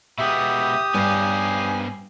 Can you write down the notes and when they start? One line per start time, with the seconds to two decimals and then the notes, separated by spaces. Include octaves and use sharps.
0.18 B2 G#3 B3 G4 E5 D#6
0.94 G2 B3 C#4 F5 G#5